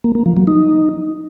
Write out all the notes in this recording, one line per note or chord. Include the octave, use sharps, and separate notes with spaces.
A#3
A#3
F3
F#3
D#4